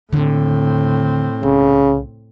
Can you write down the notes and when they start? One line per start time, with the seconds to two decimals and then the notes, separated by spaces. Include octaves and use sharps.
0.13 D#2 A2 D3 C4
1.43 C2 C#3